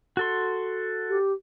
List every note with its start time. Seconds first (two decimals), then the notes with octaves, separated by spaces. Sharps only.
0.17 F#4 A4 C6
1.09 G4